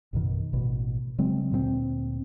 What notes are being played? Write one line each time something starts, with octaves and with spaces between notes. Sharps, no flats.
A1 F#2 B2 D#3
A1 B2
C#3 F#3 G#3 C4
D2 A#2 A3 C4